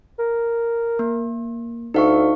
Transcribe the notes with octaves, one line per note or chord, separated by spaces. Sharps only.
A#4
A#3
D2 D#4 F5 C#6